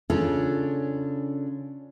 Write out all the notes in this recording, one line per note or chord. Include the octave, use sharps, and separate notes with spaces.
C#3 C#4 D4 F4 A4